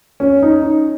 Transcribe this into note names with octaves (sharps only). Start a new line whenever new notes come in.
C#4
D#4